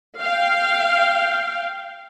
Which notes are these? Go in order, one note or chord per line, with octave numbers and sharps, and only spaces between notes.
F5 G5